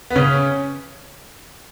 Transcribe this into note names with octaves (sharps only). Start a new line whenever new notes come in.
B3
C#3 C#4